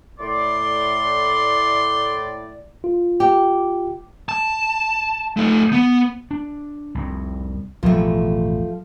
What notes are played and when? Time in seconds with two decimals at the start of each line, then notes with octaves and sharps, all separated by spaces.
0.19 A2 D5 C6
2.84 F4
3.20 G4
4.29 A5
5.37 A3 D#4
5.73 B3
6.31 D4
6.95 C2 F2
7.83 A1 E2 B2 F3 A3